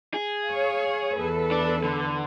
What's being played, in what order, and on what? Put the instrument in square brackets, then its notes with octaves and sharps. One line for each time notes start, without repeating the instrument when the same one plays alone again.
[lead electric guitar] G#4
[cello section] C#5 F5
E2 A4 B4
[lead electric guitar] D4
D3